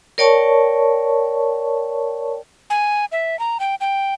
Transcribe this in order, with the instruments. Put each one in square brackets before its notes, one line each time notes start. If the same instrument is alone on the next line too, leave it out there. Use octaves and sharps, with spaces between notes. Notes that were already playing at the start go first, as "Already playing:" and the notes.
[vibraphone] A#4 C#5 D5 G5 A5 C#6
[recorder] G#5
E5
A#5
G5
G5